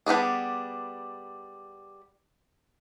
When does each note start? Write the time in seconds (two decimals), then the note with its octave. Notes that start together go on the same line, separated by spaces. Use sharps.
0.06 G3 B3 D4 G#4